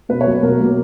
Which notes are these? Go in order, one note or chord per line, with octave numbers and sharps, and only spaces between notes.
B2 B4
C#5
F#3 A#3
B2 A#4
F#3 A#3